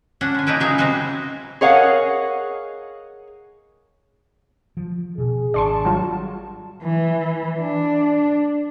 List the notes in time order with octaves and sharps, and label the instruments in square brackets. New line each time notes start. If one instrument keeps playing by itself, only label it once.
[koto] C#4 D4 F#5
D3 G#5
A#2 E3 D#4 E4 B4
C#3 F#3 D#4 G#4 G#5
C3 E3 G#3 F#4 D#5
[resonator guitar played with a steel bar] G#4 A#4 C#5 D#5 F5 F#5
[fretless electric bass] F3
[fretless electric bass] B2 [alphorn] G#4
[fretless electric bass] G#1 D4 [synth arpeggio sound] D5 C6 C#6 [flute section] A5
[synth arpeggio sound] F#3 G3 F4
[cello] E3
D4